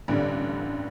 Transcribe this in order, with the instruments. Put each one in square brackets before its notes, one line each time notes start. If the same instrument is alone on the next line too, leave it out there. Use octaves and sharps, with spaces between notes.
[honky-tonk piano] A1 G2 D3 G3